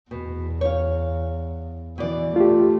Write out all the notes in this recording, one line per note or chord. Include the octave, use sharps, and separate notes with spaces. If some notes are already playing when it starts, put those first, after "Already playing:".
E2 B2
C#5 F5
B2 E3 D5
A3 F4 G4